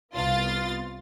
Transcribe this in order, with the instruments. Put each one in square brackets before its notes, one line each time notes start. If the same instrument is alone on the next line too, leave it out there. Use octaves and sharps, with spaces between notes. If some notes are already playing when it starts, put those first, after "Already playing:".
[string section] C2 B3 F4 A6